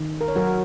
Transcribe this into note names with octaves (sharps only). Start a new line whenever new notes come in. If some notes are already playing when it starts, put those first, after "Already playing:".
Already playing: D#3
A#4
C#5
F#3 F#4 A#4